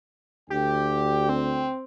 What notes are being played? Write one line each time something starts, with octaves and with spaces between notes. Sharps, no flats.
D2 D3 G4 G5
C4